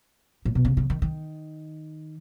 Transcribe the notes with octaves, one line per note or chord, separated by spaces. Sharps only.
A2
B2
C#3
C#3
D#3
D#3